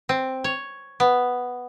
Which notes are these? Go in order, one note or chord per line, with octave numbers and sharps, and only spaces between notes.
C4
C#5
B3